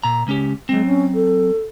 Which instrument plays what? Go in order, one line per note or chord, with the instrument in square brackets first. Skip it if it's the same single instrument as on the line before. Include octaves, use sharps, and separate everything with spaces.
[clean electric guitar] A#2 A#5
C#2 C#4 G4
[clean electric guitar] F#3 C4 [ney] G#3
[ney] C#4
A4